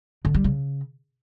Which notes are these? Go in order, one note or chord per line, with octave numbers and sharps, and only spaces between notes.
D3
G3
C#3